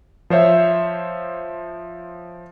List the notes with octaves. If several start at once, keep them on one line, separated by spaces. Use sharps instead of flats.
F3 C5 C#5 E5